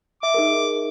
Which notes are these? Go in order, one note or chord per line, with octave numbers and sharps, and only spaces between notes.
E5 D6
D#4 G#4 A#4